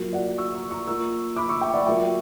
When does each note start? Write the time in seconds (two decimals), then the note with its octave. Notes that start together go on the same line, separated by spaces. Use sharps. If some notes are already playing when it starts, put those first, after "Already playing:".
Already playing: A#2 F#3 A#3
0.13 D5 F#5
0.38 C#6 E6
0.54 A#5 C#6
0.71 A#5 C#6
0.87 A#2 A#3 C#6 E6
1.36 B5 D6
1.49 C#6 E6
1.61 E5 G5
1.74 D5 F#5
1.86 A#2 F#3 A#3 E5 G5